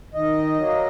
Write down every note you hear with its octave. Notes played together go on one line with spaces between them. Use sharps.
D#3 D#5
F#3 A#3